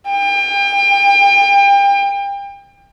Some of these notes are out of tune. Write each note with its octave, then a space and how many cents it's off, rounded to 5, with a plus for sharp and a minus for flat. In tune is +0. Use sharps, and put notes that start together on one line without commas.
G5 +35